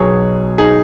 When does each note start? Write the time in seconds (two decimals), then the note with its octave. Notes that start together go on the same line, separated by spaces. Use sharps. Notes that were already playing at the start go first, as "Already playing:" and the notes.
Already playing: B1 B2 F#3 G#4 C#5
0.58 D#4 G#4